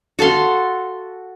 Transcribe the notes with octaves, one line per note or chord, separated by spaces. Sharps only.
F#4 A4 F5 C6